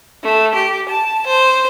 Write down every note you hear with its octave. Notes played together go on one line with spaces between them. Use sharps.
A3
G4
A5
C5